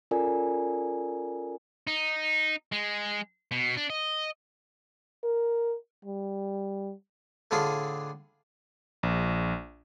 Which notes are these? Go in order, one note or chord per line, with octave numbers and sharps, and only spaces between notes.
C#4 F4 A4 A#4 D5 G#5
D#4
G#3
B2
D4
D#5
A#4
G3
A2 D3 D4 F4 G#4
A#1